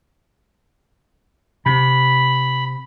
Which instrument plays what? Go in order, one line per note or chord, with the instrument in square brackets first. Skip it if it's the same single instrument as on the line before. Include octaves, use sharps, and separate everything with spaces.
[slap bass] C3 [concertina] B5